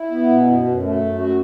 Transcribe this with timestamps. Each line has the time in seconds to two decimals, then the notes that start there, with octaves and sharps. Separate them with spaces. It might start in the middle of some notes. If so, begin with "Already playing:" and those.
Already playing: E4
0.11 B3
0.29 B2
0.47 F#2
0.65 F#2
0.82 A3
1.01 F#2
1.19 F#4